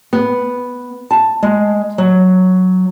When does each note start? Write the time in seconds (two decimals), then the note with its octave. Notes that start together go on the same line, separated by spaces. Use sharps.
0.13 B3
1.11 A5
1.43 G#3
1.98 F#3